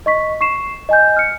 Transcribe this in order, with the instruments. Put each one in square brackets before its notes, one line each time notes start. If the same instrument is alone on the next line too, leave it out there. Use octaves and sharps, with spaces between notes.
[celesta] D#5 C#6 B6
C#6 C7 E7
D#5 G#5 G6
F6 C#7